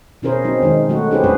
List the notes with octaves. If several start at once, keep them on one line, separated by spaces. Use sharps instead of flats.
B2 C#4 E4 G#4 A#4 C5
F#3 C4 D#4
D#3 G#3 D#4
F#3 A3 F#4
C#4 D#4 G4 G#4 B4 C5
D3 G3 D4 G#4 B4 C5